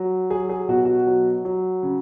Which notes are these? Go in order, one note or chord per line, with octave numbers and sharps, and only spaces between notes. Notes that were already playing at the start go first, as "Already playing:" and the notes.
Already playing: F#3
F#3 G#4
G#4
B2 F#4
F#4
F#3
F#3
C#3